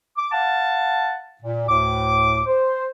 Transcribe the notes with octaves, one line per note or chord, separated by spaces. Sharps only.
D6
F5 F#5 A5
A#2
D2 A2 D6
C5